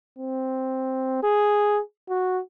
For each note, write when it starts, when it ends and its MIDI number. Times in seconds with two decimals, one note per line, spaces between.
0.19 1.22 60
1.23 1.80 68
2.09 2.40 66